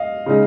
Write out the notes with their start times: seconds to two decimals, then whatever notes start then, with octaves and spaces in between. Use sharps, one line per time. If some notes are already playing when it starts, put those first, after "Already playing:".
Already playing: D#5 F5
0.26 C#3 G#3 D#4